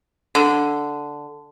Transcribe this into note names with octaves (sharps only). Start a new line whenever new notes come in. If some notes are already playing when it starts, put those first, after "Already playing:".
D3